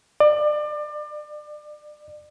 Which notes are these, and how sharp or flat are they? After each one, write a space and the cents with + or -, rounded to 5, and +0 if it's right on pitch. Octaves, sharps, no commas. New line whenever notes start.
D5 +30